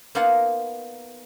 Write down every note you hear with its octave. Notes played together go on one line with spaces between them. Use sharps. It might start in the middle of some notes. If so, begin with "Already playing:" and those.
A#3 B3 D#4 F4 A#4 F#5